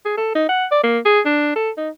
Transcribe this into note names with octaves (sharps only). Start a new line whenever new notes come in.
G#4
A4
D#4
F#5
D5
A#3
G#4
D4
A4
D#4